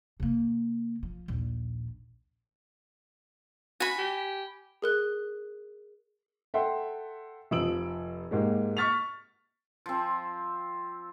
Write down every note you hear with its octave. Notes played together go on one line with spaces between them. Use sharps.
C3 A#3
F3
A#1 D#2
F#4 G#5 B5
G4
G#4 A#4 F#6
A4 E5 F#5 G5 C6
F1 F3 D#6 E6 D7 F#7
G#2 G#3 A#3 G4
C#6 F6 A6 B6 F7
F3 C4